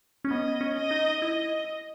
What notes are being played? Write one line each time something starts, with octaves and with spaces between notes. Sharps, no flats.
C#4
B3 D#5
C#4
D#5
D#4
E4 D#5